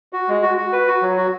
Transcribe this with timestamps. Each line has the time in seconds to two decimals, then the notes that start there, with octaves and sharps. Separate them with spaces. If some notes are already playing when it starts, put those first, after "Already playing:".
0.13 F#4
0.29 G#3
0.43 F#4
0.58 F#4
0.73 B4
0.88 F#4
1.02 F#3
1.17 F#4